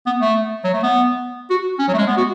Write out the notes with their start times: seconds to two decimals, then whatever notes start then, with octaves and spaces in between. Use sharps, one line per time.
0.06 B3
0.21 A3
0.64 F#3
0.74 A3
0.83 B3
1.50 F#4
1.79 C#4
1.88 F#3
1.94 A3
1.98 G#3
2.07 B3
2.17 F#4